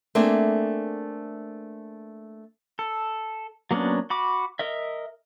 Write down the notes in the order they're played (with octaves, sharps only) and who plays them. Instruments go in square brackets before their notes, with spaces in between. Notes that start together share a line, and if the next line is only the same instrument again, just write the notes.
[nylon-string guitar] A3 A#3 C4 D4 G#4
[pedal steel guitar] A4
F#3 A#3 B3 C#4 D4
F#4 B5 D6
A#4 D#5 E5